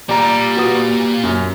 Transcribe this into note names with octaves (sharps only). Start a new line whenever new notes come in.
A#2 G3 D5 A#5
F#4 B4 D#6
F#2